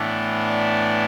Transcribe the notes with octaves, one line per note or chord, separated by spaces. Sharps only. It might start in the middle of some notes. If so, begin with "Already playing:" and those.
Already playing: A2 E3 B3 D4
D5